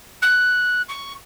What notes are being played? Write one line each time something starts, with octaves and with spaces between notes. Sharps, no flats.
F#6
C#6